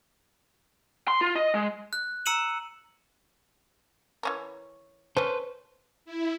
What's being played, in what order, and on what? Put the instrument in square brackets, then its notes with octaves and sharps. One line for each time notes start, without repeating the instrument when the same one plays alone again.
[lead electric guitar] C6
F4
D#5
G#3
[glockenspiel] F#6
A#5 E6 C#7 D#7 E7 F#7
[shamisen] E3 C#4 A#4
[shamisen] C#4 A4 [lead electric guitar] B4 C5
[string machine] E4